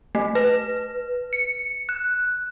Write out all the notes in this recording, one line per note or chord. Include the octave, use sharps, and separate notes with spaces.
A3
B4
C#7
F#6